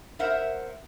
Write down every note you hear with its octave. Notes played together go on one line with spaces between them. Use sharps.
A#4 C5 E5 F#5